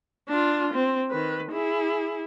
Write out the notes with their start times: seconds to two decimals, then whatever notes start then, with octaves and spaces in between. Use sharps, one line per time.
0.29 D4 F4
0.74 C4
1.11 D#3 B4
1.52 E4 G#4